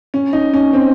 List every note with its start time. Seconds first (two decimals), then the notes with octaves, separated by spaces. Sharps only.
0.14 C#4
0.33 D#4
0.53 C#4
0.73 C4